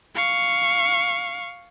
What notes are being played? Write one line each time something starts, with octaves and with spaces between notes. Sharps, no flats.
F5 C#6